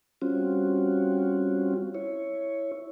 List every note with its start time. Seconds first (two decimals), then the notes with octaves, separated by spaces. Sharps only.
0.22 G3 C4 C#4 F4 F#4
1.95 E4 C#5